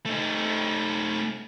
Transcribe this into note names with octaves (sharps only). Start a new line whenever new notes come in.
A3 D#4